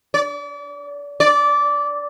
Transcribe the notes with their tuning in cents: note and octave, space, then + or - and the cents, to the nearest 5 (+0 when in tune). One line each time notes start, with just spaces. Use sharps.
D5 -35
D5 -15